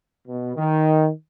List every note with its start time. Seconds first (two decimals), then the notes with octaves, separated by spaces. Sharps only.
0.27 B2
0.56 D#3